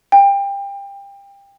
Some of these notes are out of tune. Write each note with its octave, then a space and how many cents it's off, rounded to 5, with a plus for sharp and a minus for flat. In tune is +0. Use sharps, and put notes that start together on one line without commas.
G5 +25